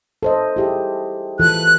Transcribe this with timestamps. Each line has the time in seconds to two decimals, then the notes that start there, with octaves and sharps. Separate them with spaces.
0.23 A4 C5 D#5
0.56 E4 G4 G#4
1.40 E3 F4 A4 F#6